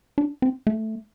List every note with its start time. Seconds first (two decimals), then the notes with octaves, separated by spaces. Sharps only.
0.18 D4
0.42 C4
0.67 A3